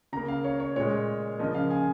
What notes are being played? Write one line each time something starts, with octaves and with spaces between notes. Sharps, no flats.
C#3 A#3 A#5
F5
C#5
C#5
A#2 G#3 C#5
C#3 F3 A#3 D#5
F5
G#5